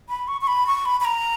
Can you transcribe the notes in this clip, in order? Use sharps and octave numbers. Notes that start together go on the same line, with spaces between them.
B5
C#6
C#6
B5
C#6
B5
B5
A#5